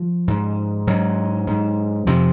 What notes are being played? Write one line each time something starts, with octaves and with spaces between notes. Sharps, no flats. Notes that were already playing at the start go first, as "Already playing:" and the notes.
Already playing: F3
G#2
G#2 F#3
G#2
F2 C3 F3